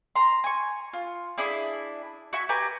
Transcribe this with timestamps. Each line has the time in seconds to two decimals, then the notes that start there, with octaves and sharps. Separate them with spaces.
0.16 A#5 C6
0.44 G#5 C#6
0.93 F4
1.38 D4 E4 G#4
2.33 F#4 E5 G#5 C#6
2.49 G4 B4 G#5 A#5